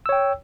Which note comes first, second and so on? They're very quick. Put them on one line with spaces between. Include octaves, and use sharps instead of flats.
E6 C#5 G5